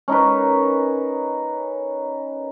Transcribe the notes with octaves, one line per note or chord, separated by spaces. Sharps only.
C#4 D#4 A#4 B4